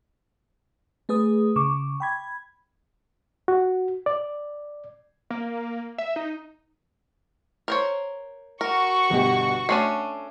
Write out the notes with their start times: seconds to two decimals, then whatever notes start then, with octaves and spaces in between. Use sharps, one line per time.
1.09 A3 G#4 B4 D#6
1.56 C#3 C#6 D6
2.00 G5 B5 G#6
3.48 F#4
4.06 D5
5.30 A#3
5.98 E5
6.16 D#4
7.68 A#4 C5 C#5
8.61 F#4 A#4 C#6
9.10 G1 B2 G4
9.69 A3 C#4 D4 C7 D#7